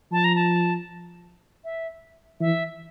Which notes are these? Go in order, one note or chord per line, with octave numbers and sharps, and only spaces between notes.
F3 A5
A#5
A5
E5
E3 E5